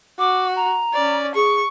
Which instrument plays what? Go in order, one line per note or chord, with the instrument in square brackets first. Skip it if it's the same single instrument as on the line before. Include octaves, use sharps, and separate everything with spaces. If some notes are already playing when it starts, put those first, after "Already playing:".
[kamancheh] F#4 [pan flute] D6
[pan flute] A#5
[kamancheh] C#4 D5
[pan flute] G#4 [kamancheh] C#6